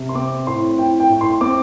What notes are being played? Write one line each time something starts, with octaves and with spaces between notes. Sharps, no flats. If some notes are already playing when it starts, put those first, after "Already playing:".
Already playing: C3
C6
C4 D6
A2 C6
E4 G5
G5
A2
C6
C4 D6